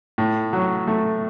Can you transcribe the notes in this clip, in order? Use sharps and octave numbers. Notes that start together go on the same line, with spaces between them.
A2
F#3
A3